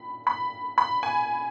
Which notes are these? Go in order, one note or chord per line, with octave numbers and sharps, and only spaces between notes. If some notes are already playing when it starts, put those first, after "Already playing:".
Already playing: B5
B5
B5
G#5